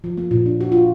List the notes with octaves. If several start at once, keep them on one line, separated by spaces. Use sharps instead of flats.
F3
A#3
A#2
D4
F#4
F4